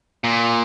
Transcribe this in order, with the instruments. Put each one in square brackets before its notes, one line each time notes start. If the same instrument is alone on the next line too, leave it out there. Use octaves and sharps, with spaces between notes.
[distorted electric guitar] A#2